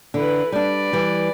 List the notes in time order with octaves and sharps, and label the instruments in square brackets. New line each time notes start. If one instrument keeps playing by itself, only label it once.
[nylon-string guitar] D3 [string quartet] E3 B4
[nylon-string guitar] G3 D4 [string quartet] B4 D5
[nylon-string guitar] E3 G3